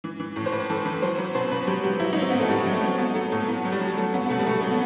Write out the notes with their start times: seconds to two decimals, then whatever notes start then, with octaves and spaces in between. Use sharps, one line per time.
0.04 E3
0.20 E3
0.36 A2
0.46 C5
0.52 A2 B4
0.70 E3 A4
0.85 E3 B4
1.02 F#3 C5
1.18 F#3 B4
1.35 B2 C5
1.51 B2 B4
1.67 F#3 G4
1.84 F#3 G4
2.00 F#3 E4
2.13 F#3 D#4
2.22 C4
2.30 A2 B3
2.40 A3
2.49 A2 G3
2.66 F#3
2.74 A3
2.82 F#3
2.98 F#3 B3
3.15 F#3 A3
3.31 A2 A3
3.48 A2 B3
3.64 F#3
3.72 G3
3.80 F#3
3.97 F#3 A3
4.14 F#3 B3
4.26 B3
4.29 B2 A3
4.39 G3
4.46 B2 A3
4.61 F#3 A3
4.71 B3